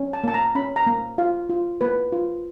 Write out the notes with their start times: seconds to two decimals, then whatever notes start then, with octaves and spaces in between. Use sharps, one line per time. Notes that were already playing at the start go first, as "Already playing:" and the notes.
Already playing: C#4
0.13 A5
0.24 A#3 A5
0.34 A#5
0.55 C#4 B5
0.76 A#5
0.86 A#3
1.18 F4 F5
1.50 F4
1.81 A#3 B4
2.12 F4